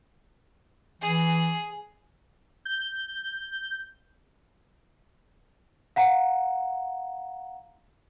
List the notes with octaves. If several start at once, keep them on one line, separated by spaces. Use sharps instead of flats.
E3 G#4
G6
F5 F#5 A#5